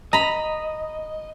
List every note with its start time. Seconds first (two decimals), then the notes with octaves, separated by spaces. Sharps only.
0.13 D#5 A#5 B5